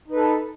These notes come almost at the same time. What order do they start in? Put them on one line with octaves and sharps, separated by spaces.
D#4 B4 A4